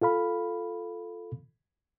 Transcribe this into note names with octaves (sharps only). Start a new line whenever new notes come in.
F4 A4 F5 B5